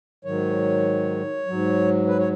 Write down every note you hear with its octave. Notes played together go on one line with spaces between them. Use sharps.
G#2 D#3 F#3 C#5
G#2 F#3
B4
C#5